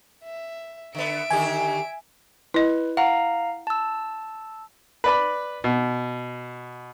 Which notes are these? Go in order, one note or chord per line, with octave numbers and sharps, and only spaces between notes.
E5
D3 B3 E5 D7
D3 D#3 G4 G#5
E4 B4 D#5
F5 F#5 A#5
A5 E6
B4 D5 B5
B2